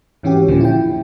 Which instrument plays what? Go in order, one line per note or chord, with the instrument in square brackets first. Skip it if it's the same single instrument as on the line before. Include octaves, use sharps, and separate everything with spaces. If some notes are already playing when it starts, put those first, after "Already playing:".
[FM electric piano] G#2 E3 C#4 F#4 G4
D#2 A#2 D3 F3 C#4
E4 G5